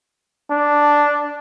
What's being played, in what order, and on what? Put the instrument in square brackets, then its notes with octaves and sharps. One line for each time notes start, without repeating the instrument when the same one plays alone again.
[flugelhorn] D4